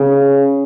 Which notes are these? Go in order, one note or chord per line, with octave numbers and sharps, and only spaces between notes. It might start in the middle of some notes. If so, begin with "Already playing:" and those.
Already playing: C#3